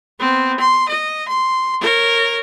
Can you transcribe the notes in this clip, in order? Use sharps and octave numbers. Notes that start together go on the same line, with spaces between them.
B3 C4
C6
D#5
C6
A#4 C#5